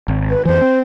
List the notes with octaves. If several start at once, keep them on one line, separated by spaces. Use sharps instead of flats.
G#1
B4
F2 E3 C5
C4